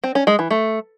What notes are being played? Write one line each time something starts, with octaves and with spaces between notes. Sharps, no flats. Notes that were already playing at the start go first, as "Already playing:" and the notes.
C4
C#4
G#3
E3
A3